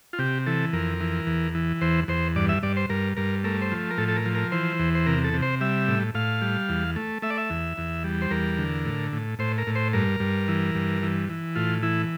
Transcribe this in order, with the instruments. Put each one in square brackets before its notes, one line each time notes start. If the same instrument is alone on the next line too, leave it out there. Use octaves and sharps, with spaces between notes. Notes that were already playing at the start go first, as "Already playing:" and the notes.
[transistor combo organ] F4
C3 G4
E3 A4
F2 A#4
E3
E2
E3
E2 C5
E2 C5
G2 D5
E5
G2 D5
C5
G2 A#4
G2 A#4
A3 A#4
C5
F3
A#4
A2 A4
A4
A#4
F3
A#4
E3 C5
E2
C5
C3 A#4
A4
C3
C5
G3 E5
A2
A2 F5
G3
E2
A3
A3 E5
D5
E5
E2
E2
G3
C5
E2 A#4
D3
A2
A2
A2 C5
A#4
A2
C5
G2 A#4
G2
E3
G2
E3
E3
A2 F4
E3 E4